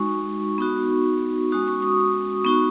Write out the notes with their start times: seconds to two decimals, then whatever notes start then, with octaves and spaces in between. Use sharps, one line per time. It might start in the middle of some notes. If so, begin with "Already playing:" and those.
Already playing: G#3 D#4 F#4 C#6
0.58 B3 D#4 F#4
1.52 G#3 C#4 F#4 D#6
1.68 C#6
1.82 D#6
2.45 B3 D#4 F#4 C#6